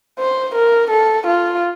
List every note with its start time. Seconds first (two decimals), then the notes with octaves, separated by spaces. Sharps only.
0.20 C5
0.55 A#4
0.91 A4
1.27 F4